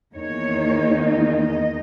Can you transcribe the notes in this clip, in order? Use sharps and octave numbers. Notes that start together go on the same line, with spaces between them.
E2 D#3 A#3 D#4 C#5
D#5
D#5